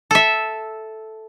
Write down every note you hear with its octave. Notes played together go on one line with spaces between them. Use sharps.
A4 E5